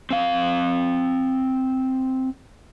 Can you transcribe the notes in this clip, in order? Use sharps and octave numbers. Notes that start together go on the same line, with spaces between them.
C4 F5